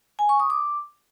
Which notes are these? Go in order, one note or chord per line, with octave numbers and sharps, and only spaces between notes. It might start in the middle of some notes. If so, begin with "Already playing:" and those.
G#5
C#6
D#6
D6